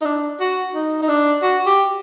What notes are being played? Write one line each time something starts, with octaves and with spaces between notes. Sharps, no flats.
D#4
D4
F#4
D#4
D#4
D4
F#4
G4